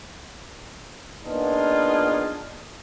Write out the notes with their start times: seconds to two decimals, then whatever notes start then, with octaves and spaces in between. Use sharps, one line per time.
1.24 A#3 B3 D4 D#4 F4 G#4